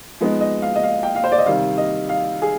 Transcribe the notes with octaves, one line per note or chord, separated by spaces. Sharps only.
F3 G#3 B3 D#4
D#5
F5
D#5
F5
G5
F5
C5
D5
D#5
C3 D#3 G3 F5
D#5
F5
G#4